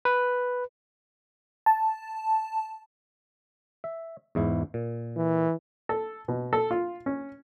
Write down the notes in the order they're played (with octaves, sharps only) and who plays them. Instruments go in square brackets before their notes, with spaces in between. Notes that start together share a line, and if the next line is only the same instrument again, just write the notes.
[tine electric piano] B4
[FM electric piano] A5
[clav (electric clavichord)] E5
E2 G#2 E4
A#2
[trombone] E3
[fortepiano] A4
B2
A4
F4
C#4